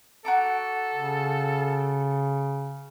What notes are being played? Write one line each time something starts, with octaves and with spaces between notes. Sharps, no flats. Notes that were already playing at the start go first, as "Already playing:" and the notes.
F#4 A4 A#5 D6
C#3